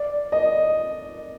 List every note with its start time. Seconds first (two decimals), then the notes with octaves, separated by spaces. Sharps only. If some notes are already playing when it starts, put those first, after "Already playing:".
Already playing: D5
0.32 D#5